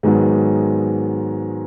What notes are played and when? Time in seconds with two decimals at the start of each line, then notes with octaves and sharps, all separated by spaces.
0.03 G#2 D#3 F#3 G#3 B3